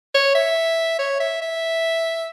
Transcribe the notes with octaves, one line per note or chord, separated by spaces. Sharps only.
C#5
E5
C#5
E5
E5